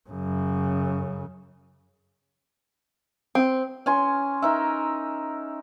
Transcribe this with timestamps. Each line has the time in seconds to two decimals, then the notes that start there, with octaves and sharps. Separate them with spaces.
0.10 F#2 C#3
3.35 C4
3.86 C#4 G#5 C6
4.42 D#4 A#4 E5